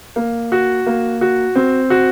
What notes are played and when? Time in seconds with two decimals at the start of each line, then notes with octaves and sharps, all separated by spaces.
0.16 A#3
0.52 F#4
0.86 A#3
1.21 F#4
1.56 C4
1.90 F#4